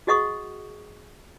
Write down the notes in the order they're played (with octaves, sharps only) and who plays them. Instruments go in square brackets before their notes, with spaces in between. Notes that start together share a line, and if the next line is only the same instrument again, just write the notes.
[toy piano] F#4 G#4 D#5 F#5 C#6 D#6